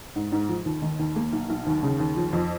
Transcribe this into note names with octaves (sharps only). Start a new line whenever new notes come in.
G#2
G#2
F3
D#2
D#3
D#2
A#3
B1
B1
D#2
C#3
D#2
F3
F2